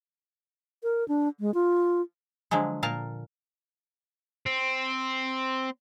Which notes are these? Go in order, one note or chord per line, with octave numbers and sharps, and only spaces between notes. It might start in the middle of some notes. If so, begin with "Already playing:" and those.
A#4
D4
G#3
F4
D3 F3 F#3 G#3
A#2 A#4 F5 A5
C4